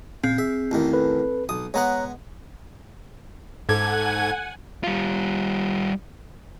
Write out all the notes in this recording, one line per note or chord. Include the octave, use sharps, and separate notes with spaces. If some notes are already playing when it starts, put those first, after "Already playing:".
A#2 C#3 C4
G#4 E5
A1 E2 D#3
A4 B4
B1 D#6
G#3 B3 C#5 F#5 A#5 F#6
G#2 A4 F#5 G#5 D6 G#6
G3 F4